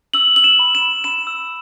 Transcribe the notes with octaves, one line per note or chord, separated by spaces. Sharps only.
E6 F#7
E6 F#7
E7
B5
E7
B5
B5 E7
E6